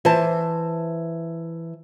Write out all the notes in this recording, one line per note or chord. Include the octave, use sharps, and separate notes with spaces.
E3 C5 A5